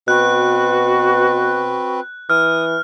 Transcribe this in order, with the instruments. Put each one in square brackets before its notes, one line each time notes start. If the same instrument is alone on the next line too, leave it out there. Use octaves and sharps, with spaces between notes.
[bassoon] B2 [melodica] C4 B4 [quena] F#4 [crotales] F#6
[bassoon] E3 [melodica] D#6 [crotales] F6